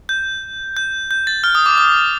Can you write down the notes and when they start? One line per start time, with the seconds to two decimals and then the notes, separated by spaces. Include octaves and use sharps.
0.09 G6
0.77 G6
1.11 G6
1.27 A6
1.44 F6
1.55 D#6
1.66 D6
1.78 D#6